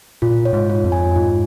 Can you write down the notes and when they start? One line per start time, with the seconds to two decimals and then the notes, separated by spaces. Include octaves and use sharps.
0.22 A#2 F4
0.45 C#5
0.53 G#2
0.70 F4
0.84 F2
0.92 G#5
1.16 G#2 F4